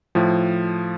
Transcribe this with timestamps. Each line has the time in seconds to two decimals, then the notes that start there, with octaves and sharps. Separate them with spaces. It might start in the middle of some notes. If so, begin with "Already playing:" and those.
0.15 A2 F3